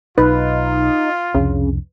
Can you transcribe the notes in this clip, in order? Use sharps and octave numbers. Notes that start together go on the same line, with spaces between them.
B1 D#4 F4 B4
C2 F2 C#3 D4